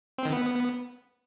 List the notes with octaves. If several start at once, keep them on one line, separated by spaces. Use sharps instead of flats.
C4
D#3
B3